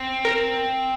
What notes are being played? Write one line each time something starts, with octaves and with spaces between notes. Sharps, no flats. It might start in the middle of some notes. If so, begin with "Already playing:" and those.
Already playing: C4
A#4